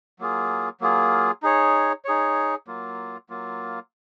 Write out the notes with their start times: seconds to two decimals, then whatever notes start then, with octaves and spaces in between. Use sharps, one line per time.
0.19 F#3 A#3 F4 G#4
0.81 F#3 A#3 F4 G#4
1.43 D#4 G#4 C#5
2.05 D#4 G#4 C#5
2.67 F#3 A#3 F4
3.29 F#3 A#3 F4